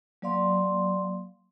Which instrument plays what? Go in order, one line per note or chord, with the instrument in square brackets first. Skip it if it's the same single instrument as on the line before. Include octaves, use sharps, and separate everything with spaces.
[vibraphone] F#3 A#3 D5 F5 C6